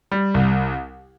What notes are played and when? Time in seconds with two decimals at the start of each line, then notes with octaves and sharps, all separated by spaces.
0.12 G3
0.34 C2